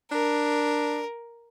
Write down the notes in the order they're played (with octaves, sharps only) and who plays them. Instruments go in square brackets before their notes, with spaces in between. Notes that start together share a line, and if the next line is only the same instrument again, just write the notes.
[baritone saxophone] D4 [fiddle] A#4